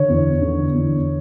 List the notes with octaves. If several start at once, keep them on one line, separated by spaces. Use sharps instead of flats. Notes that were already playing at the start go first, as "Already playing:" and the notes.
Already playing: D3 C#5
E2
D3
E2